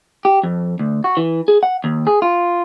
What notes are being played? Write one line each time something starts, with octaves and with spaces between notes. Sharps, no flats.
G4
F2
D2
F#4
E3
G#4
F#5
D#2
G#4
F4